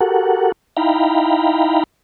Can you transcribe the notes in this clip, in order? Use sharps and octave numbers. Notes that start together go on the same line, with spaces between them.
F#4 G4 A4 A#4 F#5
D#4 E4 F5 G5 A#5 B5